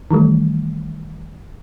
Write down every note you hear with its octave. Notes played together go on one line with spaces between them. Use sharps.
D#3 E3 G3 A3